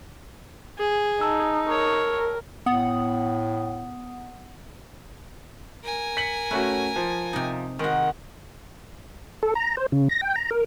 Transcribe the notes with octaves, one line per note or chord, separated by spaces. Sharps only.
G#4
D#4 A5 E6
A#4 C#5
A2 B3 F#5 D#6
A#4 G#5
B6 C#7 F#7
A3 C#4 F#4 B4
F3
C3 D#4
D#3 G#3 F#4 A#4
A4
A#5
C5
C#3
A#6
G5
A#5
A#4